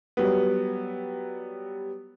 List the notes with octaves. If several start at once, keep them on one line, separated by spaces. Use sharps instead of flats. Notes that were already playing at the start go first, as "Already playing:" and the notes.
F#3 G3 B3